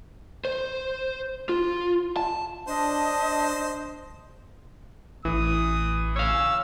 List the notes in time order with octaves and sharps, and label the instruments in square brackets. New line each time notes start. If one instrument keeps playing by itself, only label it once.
[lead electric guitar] C5
F4
A5
[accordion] D4 [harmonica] C5 [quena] D#5
[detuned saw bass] A1 [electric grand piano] E3 [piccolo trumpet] D#6
[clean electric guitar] C#5 F5 [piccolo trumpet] E6